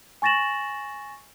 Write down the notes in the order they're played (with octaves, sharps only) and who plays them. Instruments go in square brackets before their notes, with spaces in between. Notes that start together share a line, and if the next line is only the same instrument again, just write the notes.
[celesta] G#5 C#6 A6 A#6 E7 F#7